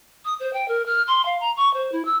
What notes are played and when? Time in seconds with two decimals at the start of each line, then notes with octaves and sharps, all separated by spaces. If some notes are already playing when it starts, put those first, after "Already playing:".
0.25 D#6
0.40 C5
0.53 G5
0.68 A#4
0.86 F6
1.07 C6
1.25 F5
1.40 A#5
1.57 C#6
1.74 C5
1.92 E4
2.05 E6